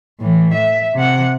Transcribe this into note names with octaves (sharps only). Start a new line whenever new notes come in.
A2 E3
E5
C3 F#5